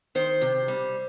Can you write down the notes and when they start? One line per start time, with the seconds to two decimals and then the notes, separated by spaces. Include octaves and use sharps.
0.15 D#3 C5
0.41 C3
0.68 G3